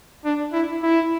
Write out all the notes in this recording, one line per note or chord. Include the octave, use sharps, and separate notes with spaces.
D4
E4
E4